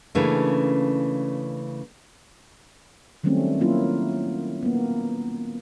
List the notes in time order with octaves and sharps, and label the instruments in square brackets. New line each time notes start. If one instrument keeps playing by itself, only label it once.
[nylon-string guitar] C#3 E3 A3 A#3 C#4 D4
[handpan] D#3 F#3 G3 A3 C4 C#4
F#3 A#3 C#4 E4 F4
A#3 B3